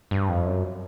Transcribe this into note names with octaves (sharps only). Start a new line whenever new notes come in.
G2
F2
F#2